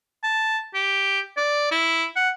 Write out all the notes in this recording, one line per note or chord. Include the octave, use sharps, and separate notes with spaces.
A5
G4
D5
E4
F#5